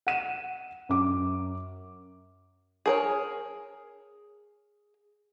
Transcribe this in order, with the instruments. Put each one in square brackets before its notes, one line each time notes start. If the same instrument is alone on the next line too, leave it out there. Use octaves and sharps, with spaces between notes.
[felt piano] F#5 D#7 E7
F#2 D6
[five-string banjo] G#4 A#4 C#5